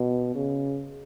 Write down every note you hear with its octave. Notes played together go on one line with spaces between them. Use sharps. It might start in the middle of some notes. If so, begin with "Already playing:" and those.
Already playing: B2
C#3